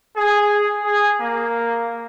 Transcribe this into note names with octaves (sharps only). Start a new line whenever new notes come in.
G#4
G#4
A#3